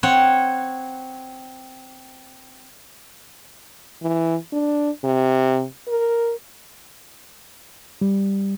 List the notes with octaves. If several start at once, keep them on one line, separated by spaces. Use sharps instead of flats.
C4 C#5 F#5
E3
D4
C3
A#4
G3